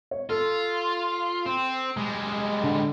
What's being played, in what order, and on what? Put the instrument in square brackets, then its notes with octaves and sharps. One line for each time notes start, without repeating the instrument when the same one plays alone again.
[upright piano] C#5
[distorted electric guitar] F4 [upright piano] A4
[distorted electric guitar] C4
G3 G#3
[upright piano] D3